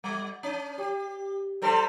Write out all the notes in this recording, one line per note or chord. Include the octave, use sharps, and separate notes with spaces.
G3
C#4
G4
G3 A4 C5